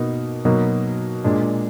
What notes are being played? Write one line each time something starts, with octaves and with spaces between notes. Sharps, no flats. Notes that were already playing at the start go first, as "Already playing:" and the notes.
Already playing: B2 A#3 D#4
B2 F#3 A#3 D#4
A#2 G#3 D4